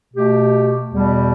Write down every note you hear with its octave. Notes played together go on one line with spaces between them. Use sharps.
B2 A3 G4
E2 B2 G3